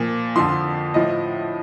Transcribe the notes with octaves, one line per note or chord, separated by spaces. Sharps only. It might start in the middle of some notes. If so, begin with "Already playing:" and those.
Already playing: A#2 F3
F2 D3 F3 C6
A2 F3 D#5